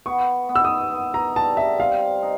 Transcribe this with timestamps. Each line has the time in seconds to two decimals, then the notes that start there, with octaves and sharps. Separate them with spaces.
0.06 B3 C#6
0.49 B3
0.55 E6
0.64 D#6
0.92 B3
1.14 A#5
1.36 G3 A5
1.57 E5
1.80 C4 F5
2.22 D#4